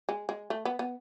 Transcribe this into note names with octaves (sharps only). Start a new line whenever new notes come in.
G#3
G#3
A3
B3
B3